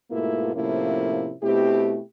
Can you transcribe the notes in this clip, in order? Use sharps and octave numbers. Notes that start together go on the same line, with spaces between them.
G#2 B2 A3 A#3 E4 F4
A2 C3 F3 A#3 C#4 E4
B2 A3 C4 E4 G4